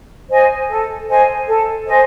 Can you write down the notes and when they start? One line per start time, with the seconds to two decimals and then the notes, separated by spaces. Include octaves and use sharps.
0.30 C5 D#5 G#5
0.69 A4
1.08 C5 D#5 G#5
1.47 A4
1.86 C5 D#5 G#5